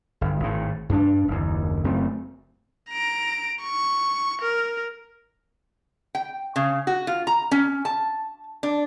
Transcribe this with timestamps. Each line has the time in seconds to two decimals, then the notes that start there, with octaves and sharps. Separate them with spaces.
0.21 G1
0.40 G#1 A2
0.89 G2 D4
1.28 F#1 D#2
1.84 F#1 F#2 A3 C4
2.90 A#5 D7
3.63 C#6
4.42 A#4
6.15 G5
6.56 C#3
6.87 F#4
7.07 F4
7.27 A#5
7.51 C#4
7.85 A5
8.63 D4